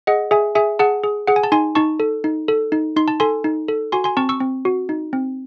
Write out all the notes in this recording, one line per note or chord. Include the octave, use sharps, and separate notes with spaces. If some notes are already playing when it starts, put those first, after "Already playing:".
G#4 D#5 F#5
G#4 E5 G#5
G#4 E5 G#5
G#4 F#5 A5
G#4
G#4 F#5
G#5
A5
D#4 G#5 C6
D#4 A5 C#6
A4
D#4
A4
D#4
D#4 C6
A5
A4 G#5 C6
D#4
A4
F#4 G#5 C6
G#5 C6
C4 A5 C#6
C#6 E6
C4
F#4
D#4
C4